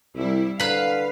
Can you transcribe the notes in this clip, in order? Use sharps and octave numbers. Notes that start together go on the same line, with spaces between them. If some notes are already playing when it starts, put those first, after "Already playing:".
C2 G3 E4
D3 B4 F5 B5